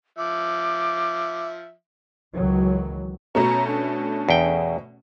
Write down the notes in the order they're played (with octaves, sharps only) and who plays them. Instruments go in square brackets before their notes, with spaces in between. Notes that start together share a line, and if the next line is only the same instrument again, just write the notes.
[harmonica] F3 E5 [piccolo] D6
[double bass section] C#2 D#3 E3 F#3
[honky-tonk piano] B2 A3 C#4 [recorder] A#5
[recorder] D4
[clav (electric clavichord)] E2 G5